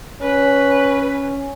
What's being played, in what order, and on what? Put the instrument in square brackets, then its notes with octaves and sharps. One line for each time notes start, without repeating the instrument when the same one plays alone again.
[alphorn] C#4 [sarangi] B4